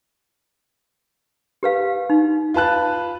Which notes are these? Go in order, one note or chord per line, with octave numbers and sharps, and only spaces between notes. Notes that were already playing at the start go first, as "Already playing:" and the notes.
G4 B4 F5
D#4
F4 B4 A5 F#6